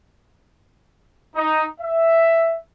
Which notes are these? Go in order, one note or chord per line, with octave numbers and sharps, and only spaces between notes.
D#4
E5